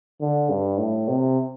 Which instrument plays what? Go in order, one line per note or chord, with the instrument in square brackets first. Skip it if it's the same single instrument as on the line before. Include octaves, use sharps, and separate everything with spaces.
[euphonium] D3
G2
A2
C3